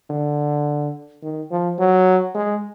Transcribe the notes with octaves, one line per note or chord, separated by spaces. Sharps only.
D3
D#3
F3
F#3
G#3